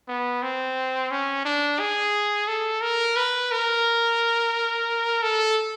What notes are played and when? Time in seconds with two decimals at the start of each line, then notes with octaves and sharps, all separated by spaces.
0.08 B3
0.43 C4
1.11 C#4
1.45 D4
1.80 G#4
2.48 A4
2.82 A#4
3.16 B4
3.52 A#4
5.23 A4